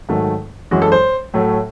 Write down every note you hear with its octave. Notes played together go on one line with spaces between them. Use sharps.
G#2 D#3 F#3 A3
F#2 E3 G#3 F#4
A4
C5
A2 F#3 A3